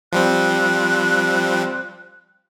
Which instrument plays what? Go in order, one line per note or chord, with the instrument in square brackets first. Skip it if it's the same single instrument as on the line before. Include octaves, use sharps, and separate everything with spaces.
[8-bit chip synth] F3 G3 C4 [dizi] F#6